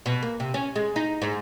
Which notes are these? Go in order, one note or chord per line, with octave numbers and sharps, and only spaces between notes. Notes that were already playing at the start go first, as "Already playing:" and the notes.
B2
A#3
C3
C#4
G#3
D#4
G#2